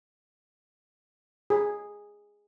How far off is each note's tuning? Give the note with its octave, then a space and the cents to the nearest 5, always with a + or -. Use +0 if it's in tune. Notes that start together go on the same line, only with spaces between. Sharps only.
G#4 -10